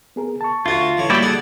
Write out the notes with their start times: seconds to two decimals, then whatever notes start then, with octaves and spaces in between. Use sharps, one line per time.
0.16 B3 G#4 A#4
0.41 A5 C#6
0.66 D2 F4 F#4
0.97 A1 D3 C#5
1.10 G3 A#3 E4 F#4 G4 D5 G5 B5
1.23 D3 G#4 D5 F#5